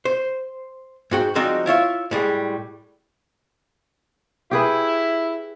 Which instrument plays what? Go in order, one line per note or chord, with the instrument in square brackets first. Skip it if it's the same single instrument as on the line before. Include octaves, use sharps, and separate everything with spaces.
[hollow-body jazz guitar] C5
G#2 F#4 G5
F3 G3 G#3 C4 D#4 F#4
E4 F4 C#5 E5
A2 G3 G#3
[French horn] E4 [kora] G4 G#4 B4